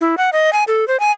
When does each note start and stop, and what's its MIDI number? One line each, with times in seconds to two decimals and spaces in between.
0.01 0.15 64
0.18 0.30 78
0.33 0.53 75
0.53 0.64 80
0.68 0.87 69
0.88 0.99 72
1.00 1.12 80